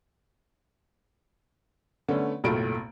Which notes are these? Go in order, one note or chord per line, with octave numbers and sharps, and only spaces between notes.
D3 A3 B3 C#4
F#1 B1 A2 A3 F4 D7